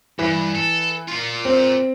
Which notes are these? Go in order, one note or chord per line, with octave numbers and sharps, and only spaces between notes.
G2 E3
A4
A#2 F4
C4